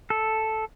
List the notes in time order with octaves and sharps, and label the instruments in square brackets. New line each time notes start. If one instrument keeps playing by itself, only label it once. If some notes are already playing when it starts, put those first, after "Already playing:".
[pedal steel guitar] A4